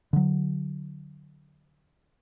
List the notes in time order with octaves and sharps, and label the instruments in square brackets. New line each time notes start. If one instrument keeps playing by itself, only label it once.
[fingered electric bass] D3 F#3